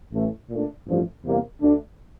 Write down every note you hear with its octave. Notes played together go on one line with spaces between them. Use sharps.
A1 A2 E3 A3
A#2 A3 D4
A1 G2 F3 A3
E2 C3 G3 A#3
D2 D3 A3 D4